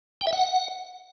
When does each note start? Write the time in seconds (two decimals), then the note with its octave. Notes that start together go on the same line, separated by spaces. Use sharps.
0.21 G5
0.27 E5
0.33 F#5